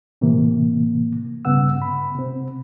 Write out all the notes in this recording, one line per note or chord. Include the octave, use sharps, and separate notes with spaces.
A2 C3 E3 A#3
G2 C#3 B3 F#5 E6
B5
C3 C4